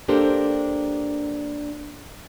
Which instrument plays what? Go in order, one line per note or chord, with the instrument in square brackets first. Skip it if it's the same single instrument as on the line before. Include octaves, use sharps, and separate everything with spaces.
[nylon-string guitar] A#3 D4 G4 A4 A#4 C5